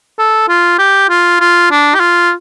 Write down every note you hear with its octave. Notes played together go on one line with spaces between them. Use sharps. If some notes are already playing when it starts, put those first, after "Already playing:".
A4
F4
G4
F4
F4
D4
G4
F4